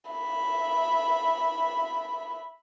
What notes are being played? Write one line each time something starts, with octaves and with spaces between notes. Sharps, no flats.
E5 B5